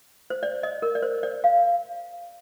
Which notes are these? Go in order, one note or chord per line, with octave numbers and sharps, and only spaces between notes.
C5
D5
D#5
A#4
D5
C5
D5
F5